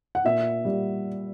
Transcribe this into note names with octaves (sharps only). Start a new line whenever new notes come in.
F#5
A#2 E5
G3